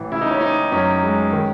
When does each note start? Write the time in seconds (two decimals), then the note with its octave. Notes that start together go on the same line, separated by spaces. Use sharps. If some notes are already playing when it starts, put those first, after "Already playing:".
Already playing: A1 E3
0.12 C#3 E4
0.21 D#4
0.31 C#4
0.41 C#4 D#4
0.72 F#2 C#4
1.03 G#3
1.33 D#3